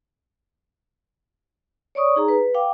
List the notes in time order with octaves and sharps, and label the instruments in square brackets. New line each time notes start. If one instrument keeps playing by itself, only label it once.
[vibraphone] C#5 D5 C#6 D#6
D#4 G#4 A#5
B4
F5 G5 D6